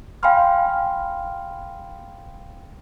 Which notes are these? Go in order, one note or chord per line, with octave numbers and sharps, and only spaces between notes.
F5 G5 G#5 B5 C6 F6